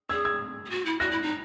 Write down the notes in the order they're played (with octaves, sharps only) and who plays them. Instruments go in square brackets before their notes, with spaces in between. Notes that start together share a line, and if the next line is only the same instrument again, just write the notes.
[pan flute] G#4 [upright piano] E6 G#6
[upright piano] E6 G#6
[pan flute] G#4
F#4
E4
[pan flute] F#4 [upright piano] F#6 A#6
[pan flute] E4
D#4